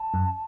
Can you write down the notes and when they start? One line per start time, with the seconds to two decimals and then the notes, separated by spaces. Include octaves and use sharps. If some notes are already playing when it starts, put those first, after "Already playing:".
Already playing: A5
0.14 F#2